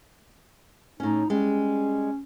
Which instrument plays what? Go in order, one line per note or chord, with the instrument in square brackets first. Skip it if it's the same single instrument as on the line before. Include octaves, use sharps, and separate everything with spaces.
[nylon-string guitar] A2 C#4 [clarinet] D#4
[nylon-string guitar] G3 G#3 [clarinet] C#4